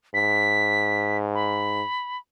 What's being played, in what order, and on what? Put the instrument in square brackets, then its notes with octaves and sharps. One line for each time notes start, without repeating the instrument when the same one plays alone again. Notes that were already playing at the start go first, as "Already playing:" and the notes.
[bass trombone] G#2 [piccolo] B6
[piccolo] B5